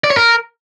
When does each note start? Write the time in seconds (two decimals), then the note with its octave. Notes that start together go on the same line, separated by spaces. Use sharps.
0.04 D5
0.10 C#5
0.17 A#4